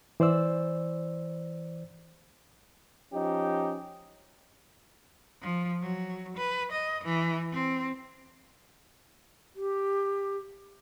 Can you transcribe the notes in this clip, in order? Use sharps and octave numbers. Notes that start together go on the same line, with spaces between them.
E3 C5 D5 E6
F3 C#4 D#4 G4
F3
F#3
B4
D#5
E3
C4
G4